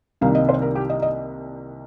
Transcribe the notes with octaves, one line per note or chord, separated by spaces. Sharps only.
C2 C3 D#3 A#3 D#4 F5
D#5
C5
A#4
G4
D#5
D#5